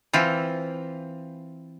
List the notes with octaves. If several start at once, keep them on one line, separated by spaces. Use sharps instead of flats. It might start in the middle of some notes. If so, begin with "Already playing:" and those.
E3 C4 F4